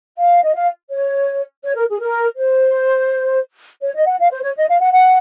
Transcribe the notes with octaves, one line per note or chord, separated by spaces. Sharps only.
F5
D#5
F5
C#5
C#5
A#4
G#4
A#4
C5
C#5
D#5
F#5
F5
C5
C#5
D#5
F5
F#5
F#5